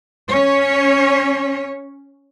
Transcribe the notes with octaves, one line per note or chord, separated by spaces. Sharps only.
C#4 C#5